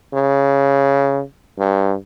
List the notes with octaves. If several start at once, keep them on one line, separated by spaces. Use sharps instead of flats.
C#3
G2